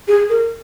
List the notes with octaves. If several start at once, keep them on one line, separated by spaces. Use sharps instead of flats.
G#4
A#4